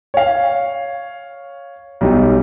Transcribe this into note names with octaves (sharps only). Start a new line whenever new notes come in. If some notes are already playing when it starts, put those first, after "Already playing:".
C#5 F5
B1 G3 D#4